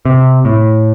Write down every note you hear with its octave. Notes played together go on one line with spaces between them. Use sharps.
C3
A2